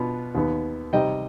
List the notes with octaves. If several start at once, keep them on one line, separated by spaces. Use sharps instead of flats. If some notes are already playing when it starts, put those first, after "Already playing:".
Already playing: B2 B3 D4 F4
D#2 D#3 B3
C3 G3 C4 D#4 D#5 G5